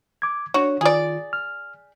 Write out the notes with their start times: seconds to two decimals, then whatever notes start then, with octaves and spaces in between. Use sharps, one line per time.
0.22 D6 G#6
0.54 D4 F#4 C#5
0.81 D#3 F4 G#4 D5
1.33 F6